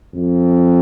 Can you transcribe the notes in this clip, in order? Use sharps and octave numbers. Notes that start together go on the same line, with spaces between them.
F2